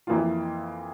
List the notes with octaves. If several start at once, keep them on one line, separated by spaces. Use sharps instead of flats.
F2 E3 A#3 F4